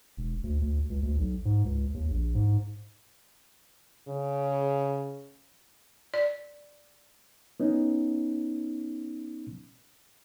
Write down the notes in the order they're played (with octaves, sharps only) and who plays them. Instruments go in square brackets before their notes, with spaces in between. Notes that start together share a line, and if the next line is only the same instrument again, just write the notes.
[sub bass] E1
D2
D2
C#2
D2
B1
G#2
C#2
D#2
A#1
G#2
[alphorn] C#3
[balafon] D5
[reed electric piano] B3 C#4 D#4